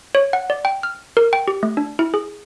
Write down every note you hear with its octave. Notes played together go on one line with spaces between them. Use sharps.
C#5
F#5
D5
G5
F6
A#4
G5
G4
A3
D4
E4
G#4